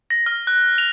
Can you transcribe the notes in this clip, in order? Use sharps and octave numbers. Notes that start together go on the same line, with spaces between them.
A#6
F6
F#6
F7